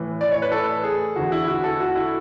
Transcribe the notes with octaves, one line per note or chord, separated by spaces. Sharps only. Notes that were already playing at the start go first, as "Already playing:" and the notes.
Already playing: A2 E3
D5
C#5
B4
A4
G#4
E2 D3 F#4
E4
F#4
A4
F#4
E4